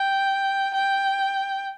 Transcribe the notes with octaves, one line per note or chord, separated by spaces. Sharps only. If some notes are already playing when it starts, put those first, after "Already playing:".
Already playing: G5
G5